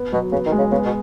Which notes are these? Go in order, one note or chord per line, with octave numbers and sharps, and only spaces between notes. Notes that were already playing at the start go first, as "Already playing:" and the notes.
Already playing: B3
B2 F#3
C#3 B3
D#3
G#3
C#3
C#3 B3
B2